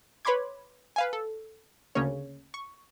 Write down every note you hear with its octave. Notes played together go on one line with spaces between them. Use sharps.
B4 C#5 B5 C6 D6 G#6
B4 F5 G#5
A4
D2 C#3 A#3 C#4 C#5
C#6